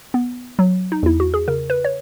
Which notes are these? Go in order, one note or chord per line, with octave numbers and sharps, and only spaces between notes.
B3
F#3
D#4
E2 E4
F#4
G#4
C#3 A#4
B4
C#5